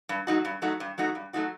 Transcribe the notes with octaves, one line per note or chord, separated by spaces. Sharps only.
G2
F#3 A3 D#4 F#4
G2
F#3 A3 D#4 F#4
G2
F#3 A3 D#4 F#4
G2
F#3 A3 D#4 F#4